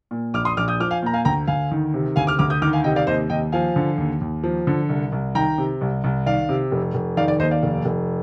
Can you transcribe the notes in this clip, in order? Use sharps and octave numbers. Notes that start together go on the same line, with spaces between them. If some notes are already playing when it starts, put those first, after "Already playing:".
A#2
A#1 D6 F6
C6 D#6
A#1 D6 F6
D#6 G6
F3 D6 F6
F5 G#5
A#2 A#5
F5 G#5
D2 G5 A#5
D2 F5 G#5
D#3
C3
D2 F5 G#5
D6 F6
D2 D6 F6
D#6 G6
D#3 D6 F6
F5 G#5
C3 D#5 G5
D5 F5
D#2 C5 D#5
D#2 D#5 G5
F3 F5 G#5
D3
D#2
D#2
F3
D3
C2
C2
D#3 G5 A#5
C3
C2
C2
D#3 D5 F5
C3
F1
F1
D#3 D5 F5
D5
D#2 C5 D#5
D5 F5
F1
F1